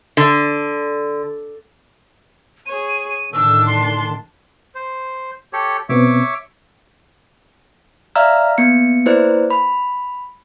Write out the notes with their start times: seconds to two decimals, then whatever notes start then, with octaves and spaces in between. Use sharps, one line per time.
0.17 D3
2.66 G#4 C#5 D#7
3.33 A2 D3 D#3 D4 A5 E6
3.67 C6
4.75 C5
5.53 G4 A4 C#5
5.89 B2 B3 C4 C#5 E5 D6
8.15 D5 E5 F5 A#5 E6 F6
8.58 A#3 B3 C#7
9.06 A#3 E4 B4 C5 D5
9.50 B5